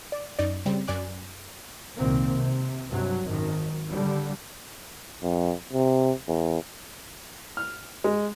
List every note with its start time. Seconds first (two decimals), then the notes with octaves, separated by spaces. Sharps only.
0.12 D5
0.39 F#2 D#4 D5
0.66 C#3 G3 C4
0.87 F#2 D5 G#5 D6 F#6
1.96 C2 A#2 D#3 A#3 C4
2.36 C3
2.88 G2 C3 F#3
3.23 G#1 F#2 D#3
3.88 D3 G3
5.23 F2
5.73 C3
6.28 E2
7.57 F6
8.04 G#3